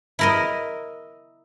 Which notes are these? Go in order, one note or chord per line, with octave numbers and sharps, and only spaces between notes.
E4 A#4 D#5